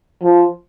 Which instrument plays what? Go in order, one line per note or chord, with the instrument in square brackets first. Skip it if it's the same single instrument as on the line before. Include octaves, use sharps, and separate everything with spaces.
[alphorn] F3